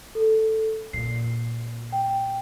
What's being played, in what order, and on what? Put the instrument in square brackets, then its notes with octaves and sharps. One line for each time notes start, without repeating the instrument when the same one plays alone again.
[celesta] A4
[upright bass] A#2 [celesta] C7
[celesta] G5